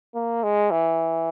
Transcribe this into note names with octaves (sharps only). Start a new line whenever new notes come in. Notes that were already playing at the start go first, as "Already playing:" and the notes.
A#3
G#3
E3